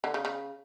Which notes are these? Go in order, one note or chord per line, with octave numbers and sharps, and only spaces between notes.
D3
C#3
C#3